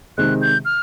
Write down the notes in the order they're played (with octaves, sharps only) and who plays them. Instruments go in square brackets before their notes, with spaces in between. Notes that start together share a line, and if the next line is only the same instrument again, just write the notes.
[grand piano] C3 D#3 G#3 C4 [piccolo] F#6
[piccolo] G6
F6